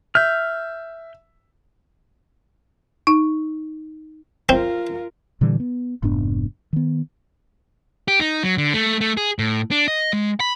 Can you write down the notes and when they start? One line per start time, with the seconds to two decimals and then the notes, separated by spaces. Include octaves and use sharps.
0.15 E5 F6 G6
3.07 D#4
4.49 C4 F4 A#4
5.41 A#2 D3 E3 G3
5.60 B3
6.02 F1 G#2 B3 D4
6.73 D#3 B3
8.08 G4
8.20 D#4
8.43 F#3
8.58 D3
8.74 A3
9.01 A3
9.17 G#4
9.39 A2
9.71 D4
9.88 D#5
10.13 G#3
10.40 B5